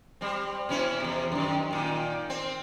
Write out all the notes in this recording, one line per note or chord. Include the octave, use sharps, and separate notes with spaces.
G3 C4
B2 C#4 E4
E2 C3
F#2 D#3
A#2 D#3
C4